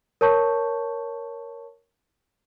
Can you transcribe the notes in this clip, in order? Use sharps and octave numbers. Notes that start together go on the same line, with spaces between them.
A#4 C#5 A5 C#6 G6